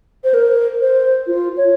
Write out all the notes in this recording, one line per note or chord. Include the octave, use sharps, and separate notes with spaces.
C5
A#4
C5
F4
C#5